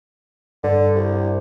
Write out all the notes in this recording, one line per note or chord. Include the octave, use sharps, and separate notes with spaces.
G2 D3
C2